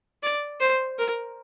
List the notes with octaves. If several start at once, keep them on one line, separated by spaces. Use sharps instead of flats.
D5
C5
A#4